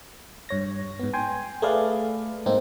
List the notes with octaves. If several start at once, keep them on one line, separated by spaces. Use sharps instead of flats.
G2 C#5 A#6
G#2 B3
G5 G#5 C6
A3 G#4 A4 B4 D5 F5
G#2 A#3 C4 D#4